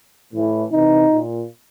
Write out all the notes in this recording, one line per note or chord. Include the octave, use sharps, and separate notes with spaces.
A2 E3
C3 E3 D#4
A#2